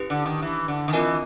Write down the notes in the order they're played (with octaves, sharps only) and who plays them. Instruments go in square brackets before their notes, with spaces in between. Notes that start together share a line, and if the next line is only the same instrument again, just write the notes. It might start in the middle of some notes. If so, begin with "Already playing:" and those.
Already playing: [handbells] C#4 E4 G4 B4
[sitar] D3
D#3
E3
D3
D#3
[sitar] E3 [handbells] C4 F4 A#4 D#5 G#5